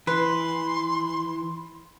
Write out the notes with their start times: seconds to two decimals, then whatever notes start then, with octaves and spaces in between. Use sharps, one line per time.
0.07 E3 B4 C6